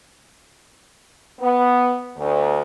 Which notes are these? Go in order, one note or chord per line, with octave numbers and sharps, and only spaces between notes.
B3
D2